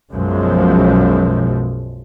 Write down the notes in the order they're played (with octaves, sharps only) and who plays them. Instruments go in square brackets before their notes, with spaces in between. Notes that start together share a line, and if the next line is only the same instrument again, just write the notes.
[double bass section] B1 F#2 B2 F3 G#3